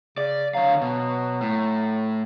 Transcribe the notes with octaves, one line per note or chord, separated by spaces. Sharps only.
C#3 D5
D3 F#3 F5
B2
A2